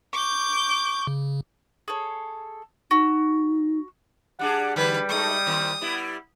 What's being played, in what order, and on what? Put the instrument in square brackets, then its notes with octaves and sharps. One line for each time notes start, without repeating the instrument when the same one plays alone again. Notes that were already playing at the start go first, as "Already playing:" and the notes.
[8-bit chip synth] C#6 [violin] D6 G6
[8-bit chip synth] C#3
[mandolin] G#4 A4 C#5
[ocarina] D#4 [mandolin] F#4
[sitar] G3 D4 G#4 [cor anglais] F#5
[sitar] D3 [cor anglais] G3 [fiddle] B4
[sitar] G#3 A3 D#4 [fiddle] D#6
[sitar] D#3 A#3 C4
G3 B3 E4